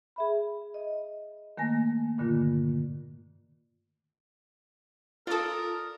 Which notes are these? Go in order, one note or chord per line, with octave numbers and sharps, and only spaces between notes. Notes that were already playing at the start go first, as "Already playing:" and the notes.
G#4 E5 B5
D#5
D#3 A3 A#3 G#5 A#6
G2 A#2 D3 D#3 A#3 F4
F4 A4 A#4 D5 D#6